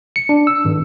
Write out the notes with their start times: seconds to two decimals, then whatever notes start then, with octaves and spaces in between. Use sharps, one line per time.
0.16 C#7
0.29 D4
0.47 E6
0.65 G#1